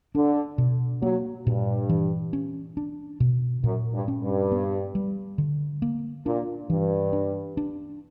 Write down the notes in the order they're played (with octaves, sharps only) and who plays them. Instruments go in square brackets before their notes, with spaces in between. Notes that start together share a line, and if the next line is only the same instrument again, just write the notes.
[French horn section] D3 [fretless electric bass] D4
[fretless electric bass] B2
[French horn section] F#3 [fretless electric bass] A#3
[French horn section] G2 [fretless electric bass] A#2
[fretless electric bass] E3
C#4
D4
B2
[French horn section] F#2 [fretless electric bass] A#2
[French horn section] G2
[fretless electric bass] C#4
[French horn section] G2
[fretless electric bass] B3
G3
D3
A#3
[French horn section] A#2 [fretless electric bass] D4
[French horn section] G2 [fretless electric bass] E3
[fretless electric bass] D4
D4